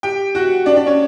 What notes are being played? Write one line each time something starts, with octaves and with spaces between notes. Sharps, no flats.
G4 G5
F#4 F#5
D4 D5
D4 D5
C#4 C#5